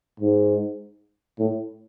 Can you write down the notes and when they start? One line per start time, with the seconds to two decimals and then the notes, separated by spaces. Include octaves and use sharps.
0.20 G#2
1.39 A2